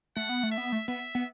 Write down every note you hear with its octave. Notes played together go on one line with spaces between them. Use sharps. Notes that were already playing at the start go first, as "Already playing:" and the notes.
A3 F#5
B3
A3
E5
B3
A3
B3 E5
B3